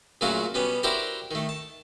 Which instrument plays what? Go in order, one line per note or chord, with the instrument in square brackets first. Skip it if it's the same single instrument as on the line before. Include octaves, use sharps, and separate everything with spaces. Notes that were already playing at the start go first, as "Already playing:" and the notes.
[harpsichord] A#2 C#3 F#3 A3 F4 F#4
B2 G3 B3 C#4
E4 F#4 G4 A#4 C5 D5
D#3 A3
A5